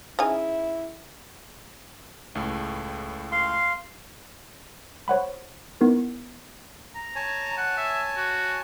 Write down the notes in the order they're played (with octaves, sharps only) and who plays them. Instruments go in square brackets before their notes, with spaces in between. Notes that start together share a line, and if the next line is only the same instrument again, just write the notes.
[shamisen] C#3 D#4 G#5 [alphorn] E4
[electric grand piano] C#2 A2 A3
[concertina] F5 C6
[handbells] C5 C#5 F#5 B5
B3 D#4 E4 A#4
[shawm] A#5
[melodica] C#5 G#5 A5
[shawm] F#5
E5
F#4